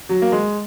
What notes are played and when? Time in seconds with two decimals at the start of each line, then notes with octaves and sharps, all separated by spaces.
0.09 F#3
0.22 A#3
0.32 G#3